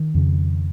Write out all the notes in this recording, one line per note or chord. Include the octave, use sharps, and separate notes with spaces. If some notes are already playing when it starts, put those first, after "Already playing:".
Already playing: D#3
F2 C#3